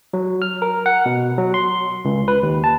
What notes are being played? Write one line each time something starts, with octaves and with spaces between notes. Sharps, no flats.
F#3
F6
A#4
F#5
B2
F#3
C6
C#2
B4
D#2
A5